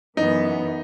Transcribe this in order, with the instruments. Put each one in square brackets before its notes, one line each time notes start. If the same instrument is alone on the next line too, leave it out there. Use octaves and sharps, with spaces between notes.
[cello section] F#2 E3 B3 [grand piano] D#4